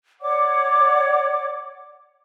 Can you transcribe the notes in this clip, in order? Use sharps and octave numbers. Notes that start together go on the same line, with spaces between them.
C#5 D5 F#5 D6